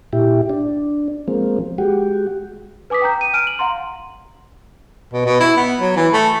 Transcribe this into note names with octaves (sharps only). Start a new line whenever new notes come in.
A#2 E4 G4
D4
F3 G#3 A#3 C4
G#3 F#4 G4
B4 G#5 D6 D#6 B6
G5 G#5 A#5 G6
D#7
G#5 F6 D7 D#7
F#7
F5 F#5 A#5 C6
B2
B2
E4
B3
F#3
E3
A3